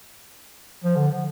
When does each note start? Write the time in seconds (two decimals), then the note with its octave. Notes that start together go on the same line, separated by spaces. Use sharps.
0.84 F3
0.96 D3